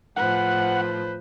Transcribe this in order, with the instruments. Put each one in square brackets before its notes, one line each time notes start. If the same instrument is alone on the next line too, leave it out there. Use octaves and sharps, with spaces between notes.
[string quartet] A2 F3 [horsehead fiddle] B4 C5 [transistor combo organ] F#5